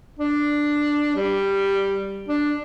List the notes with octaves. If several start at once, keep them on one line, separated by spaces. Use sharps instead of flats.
D4
G3
D4